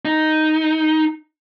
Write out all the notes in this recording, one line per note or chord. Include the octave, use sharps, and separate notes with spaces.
D#4